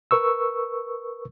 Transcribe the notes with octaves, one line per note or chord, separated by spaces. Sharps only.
A#4 B4 C#6 E6